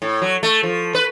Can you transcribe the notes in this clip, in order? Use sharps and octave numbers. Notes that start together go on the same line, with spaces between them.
A2
F#3
A3
F3
B4